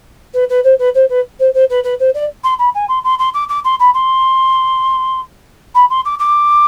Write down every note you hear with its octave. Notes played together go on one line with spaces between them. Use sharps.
B4
B4
C5
B4
C5
B4
C5
C5
B4
B4
C5
D5
C6
B5
G#5
C6
C6
C6
D6
D6
C6
B5
C6
B5
C6
D6
D6